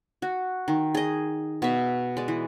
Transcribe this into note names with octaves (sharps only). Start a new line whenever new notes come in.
F#4
D#3
G#4 D#5
B2 E5
G#3 D5
E3